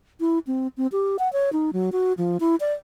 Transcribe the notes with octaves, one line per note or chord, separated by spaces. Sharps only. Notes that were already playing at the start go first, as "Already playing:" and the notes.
E4
C4
C4
G4
F#5
C#5
D#4
F#3
F#4
F3
E4
D5